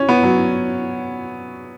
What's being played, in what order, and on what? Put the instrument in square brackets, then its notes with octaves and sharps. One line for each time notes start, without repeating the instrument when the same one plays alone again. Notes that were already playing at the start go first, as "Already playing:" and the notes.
Already playing: [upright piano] C#4
B3
F#3